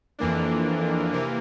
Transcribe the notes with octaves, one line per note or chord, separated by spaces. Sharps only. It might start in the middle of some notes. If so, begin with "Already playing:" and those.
F2 E3 A#3 D4
C3 E3 A#3